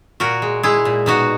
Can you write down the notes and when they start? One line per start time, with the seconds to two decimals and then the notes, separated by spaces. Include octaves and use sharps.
0.20 A#2 F#4 A#4
0.42 G#3
0.63 G#3 E4 G#4
0.85 A#2
1.06 B2 D#4 F#4